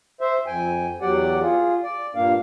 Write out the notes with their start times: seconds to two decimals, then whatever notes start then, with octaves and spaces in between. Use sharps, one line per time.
0.21 C5 E5
0.46 F2 G5 G#5
1.01 E2 F#3 G4 D5 F#5
1.41 F4 G#4
1.84 D5
2.15 G2 A#2 A#3 D4 F5